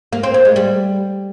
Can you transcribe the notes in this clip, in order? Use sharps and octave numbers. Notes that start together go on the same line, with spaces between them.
A#3
C4
A#3
G#3
G3